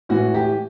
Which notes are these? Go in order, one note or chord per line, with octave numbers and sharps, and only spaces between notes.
A2 E3 F#4
G4